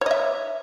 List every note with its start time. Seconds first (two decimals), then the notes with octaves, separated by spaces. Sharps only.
0.01 C#5
0.06 D#5
0.11 E5